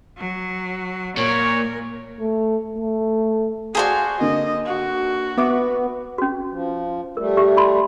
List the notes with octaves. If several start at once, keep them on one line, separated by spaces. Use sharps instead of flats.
F#3
A#2 A#4 C#5
A3
A3
F#4 G#4 C5 D5 F5 G#5 A5
D3 A#3 D#5
F#4
B3 E5 D6
C#4 F#4
F3
G3 A3 A#4
G4 E5
E4 B5 C6